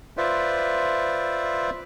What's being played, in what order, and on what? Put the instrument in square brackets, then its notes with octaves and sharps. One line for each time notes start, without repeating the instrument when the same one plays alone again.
[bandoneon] F4 B4 C5 D5 E5